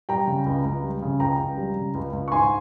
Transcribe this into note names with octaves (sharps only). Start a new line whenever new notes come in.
G3 G5 A#5
C#3
C#2
C#2
G3
C#3
C#2 G5 A#5
C#2
G3
C#3
C#2
C#2
C#6
G#2 G#5 C6